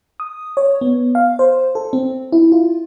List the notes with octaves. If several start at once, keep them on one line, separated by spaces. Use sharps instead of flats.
D#6
C#5
B3
F5
C5
A4
C4
E4
F4